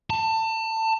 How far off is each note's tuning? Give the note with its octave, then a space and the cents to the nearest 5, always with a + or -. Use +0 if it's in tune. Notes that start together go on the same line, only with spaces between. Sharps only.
A5 +25